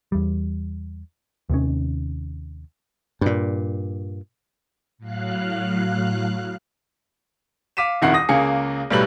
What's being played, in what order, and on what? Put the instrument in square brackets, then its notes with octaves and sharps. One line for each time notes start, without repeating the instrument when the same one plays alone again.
[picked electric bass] E2 G3
D#2 C3 D#3 C#4
[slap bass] G2 A#2
[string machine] A2 F#3 F5 F#6
[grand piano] F5 D6 B6 D#7 E7
D#1 F2 D#3 E4 F#5 C7
D#6 A#6
C#2 C#3 A#3 G#4 C#7
B1 A2 G3 B4 F#7